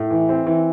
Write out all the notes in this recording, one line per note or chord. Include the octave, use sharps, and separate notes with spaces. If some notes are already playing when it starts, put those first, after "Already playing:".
Already playing: A2
E3
C4
E3